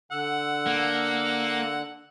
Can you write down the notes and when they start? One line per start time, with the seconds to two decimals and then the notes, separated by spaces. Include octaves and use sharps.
0.12 D3 F#5 E6
0.67 A#3